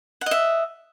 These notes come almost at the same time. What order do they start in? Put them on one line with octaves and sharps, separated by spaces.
F#5 D#5 E5